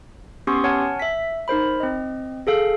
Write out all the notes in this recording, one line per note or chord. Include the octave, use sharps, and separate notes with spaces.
B3 C#4 G4 C6 C#6 D#6
C#5 F#5 G#5 A5 F6
E5 B6
D#4 A#4 C5 B5
C4 D#5
G#4 A4 F5